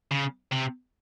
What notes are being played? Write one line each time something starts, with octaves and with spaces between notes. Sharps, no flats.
C#3
C3